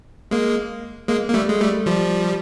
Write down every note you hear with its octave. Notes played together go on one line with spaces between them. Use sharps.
G#3 A#3
G#3 A#3
A#3
G3 A3
G#3
G3 A3
F3 G3